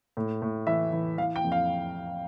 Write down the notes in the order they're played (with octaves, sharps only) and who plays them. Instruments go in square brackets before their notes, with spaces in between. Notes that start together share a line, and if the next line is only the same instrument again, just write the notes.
[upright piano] A2
A2
E3 E5
E3
E3 F5
G5
F2
F5